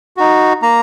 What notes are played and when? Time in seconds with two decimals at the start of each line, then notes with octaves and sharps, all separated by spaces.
0.17 D#4 F#4
0.62 A#3 A#5